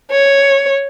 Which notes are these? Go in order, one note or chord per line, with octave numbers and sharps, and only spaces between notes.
C#5